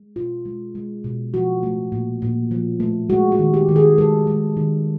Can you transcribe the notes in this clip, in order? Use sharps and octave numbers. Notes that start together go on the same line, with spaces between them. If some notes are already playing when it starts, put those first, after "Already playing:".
Already playing: G#3
B2 F4
G#3
G#3
B2
F3 F#4
A3
A#2
A#2
F3
A3
G#3 F#4
F#4
D#3
G4
D#3
G#4
G#3 A4
G#3
D#3